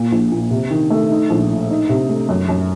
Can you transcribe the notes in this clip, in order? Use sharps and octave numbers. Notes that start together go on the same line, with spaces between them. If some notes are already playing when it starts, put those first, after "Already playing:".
Already playing: A#2
A#1
A#2
C3
D#3
A3
D#4
A#1
A2
D#4
C3
A3
F#2
F#2